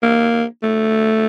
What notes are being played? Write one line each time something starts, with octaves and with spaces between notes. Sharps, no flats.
A#3
A3